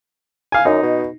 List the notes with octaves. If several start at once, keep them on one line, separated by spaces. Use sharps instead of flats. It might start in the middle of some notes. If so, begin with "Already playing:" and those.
F5 G#5
F#2 D#4
B2